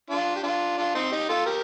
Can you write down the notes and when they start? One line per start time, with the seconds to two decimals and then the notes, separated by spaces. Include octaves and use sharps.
0.10 D4 F4
0.36 G4
0.43 D4 F4
0.77 D4 F4
0.95 C4 D#4
1.11 D#4 G4
1.29 F4 A4
1.46 G4 A#4